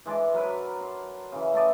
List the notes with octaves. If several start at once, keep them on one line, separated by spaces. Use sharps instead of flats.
E3 G#3 D4 D5
F#3 A#4 B4
C6
C#3 E3
A3 A4 D5 D#5